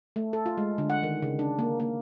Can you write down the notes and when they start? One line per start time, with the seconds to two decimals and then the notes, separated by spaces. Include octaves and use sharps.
0.16 A3
0.33 A4
0.46 F4
0.58 G#3
0.78 D3
0.90 F#5
1.03 D#3
1.22 C#3
1.39 D4
1.59 A#3
1.80 A#3